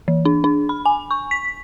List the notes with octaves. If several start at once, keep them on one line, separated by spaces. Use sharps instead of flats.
E3
D4
D4
B5
G#5
C#6
B6